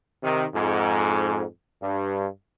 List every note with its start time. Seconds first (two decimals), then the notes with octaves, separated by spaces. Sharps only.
0.23 C3 D#3
0.55 F2 G#2
1.82 G2